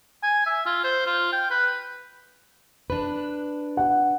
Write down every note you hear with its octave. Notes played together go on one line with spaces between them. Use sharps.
G#5
E5
F4
C5
F4
G5
B4
D4 B4
F#5